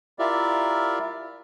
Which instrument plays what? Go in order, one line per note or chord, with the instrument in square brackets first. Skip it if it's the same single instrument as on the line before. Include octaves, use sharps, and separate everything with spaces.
[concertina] E4 F4 G4 A#4 D5 E5